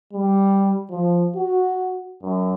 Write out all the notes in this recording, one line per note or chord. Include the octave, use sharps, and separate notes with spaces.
G3
F3
F#4
F#2